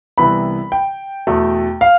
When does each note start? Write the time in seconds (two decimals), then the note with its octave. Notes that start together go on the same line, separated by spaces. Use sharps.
0.18 C2 C3 E3 B3 B5
0.72 G5
1.27 E2 B2 A3
1.81 F5